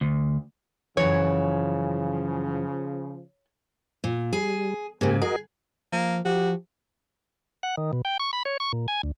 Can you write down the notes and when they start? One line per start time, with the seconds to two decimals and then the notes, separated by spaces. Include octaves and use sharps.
0.01 D2
0.97 F#2 C#3 E3 F3 C#5
4.04 A#2
4.33 G3 G#4
5.01 G#2 C#3 A#3 G4 G#5
5.22 F#4 G#4 A#4 D#5
5.92 F3 A#3
6.25 F3 F#4 G4
7.63 F#5
7.78 D#3
7.93 B2
8.05 G5
8.20 C#6
8.33 B5
8.45 C#5
8.60 C#6
8.73 A#2
8.88 G#5
9.03 D2